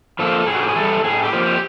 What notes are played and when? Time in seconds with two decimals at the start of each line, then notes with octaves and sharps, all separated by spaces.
0.19 F3 A#3 A4
0.47 A2 G#4
0.55 F#4
0.62 G4
0.68 G#4
0.75 E3 G3 A4
1.04 A2 G#4
1.23 G4
1.32 F3 A#3
1.42 G4